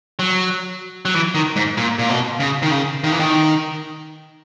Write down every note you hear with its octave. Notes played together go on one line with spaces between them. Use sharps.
F#3
F#3
E3
D#3
G#2
A#2
A#2
B2
C#3
D#3
C#3
D#3
E3
D#3